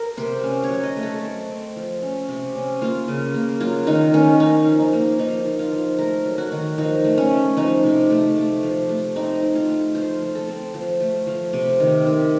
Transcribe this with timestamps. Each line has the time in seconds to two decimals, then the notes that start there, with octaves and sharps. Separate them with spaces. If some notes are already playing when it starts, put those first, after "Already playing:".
Already playing: A#4
0.17 C3 C5
0.43 C#4
0.64 C#5
0.70 F#3
0.83 D#5
0.96 A3
1.03 A4
1.23 C4
1.49 C4
1.76 F3
2.02 C#4
2.29 C3
2.55 C#4
2.81 A#3 F4
3.08 C#3
3.34 A#3
3.60 F#3 F4
3.87 D#3 D#4
4.13 D#3 C#4
4.40 C#4 D#4
4.66 F3
4.80 D#4
4.93 A#3
5.19 F3 D#4
5.46 F3
5.59 F4
5.72 F3
5.99 A3 A#4
6.25 F#3
6.38 F#4
6.52 D#3
6.78 F3 D#4
7.04 A3
7.18 C#4
7.31 A3
7.57 F3 D#4
7.84 C3
8.10 A3
8.36 A3
8.63 F3
8.89 A3
9.16 C4 D#4
9.43 C4
9.55 F4
9.68 A3
9.95 F3 C5
10.21 F3
10.35 A4
10.48 C4
10.74 F3
11.01 A3
11.27 F3
11.53 C3
11.80 D#3
12.06 C3